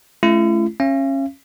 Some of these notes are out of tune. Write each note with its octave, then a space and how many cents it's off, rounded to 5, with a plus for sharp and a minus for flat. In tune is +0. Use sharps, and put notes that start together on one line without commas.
A3 -35 C#4 +0 E4 +45
C#4 -25 F5 -45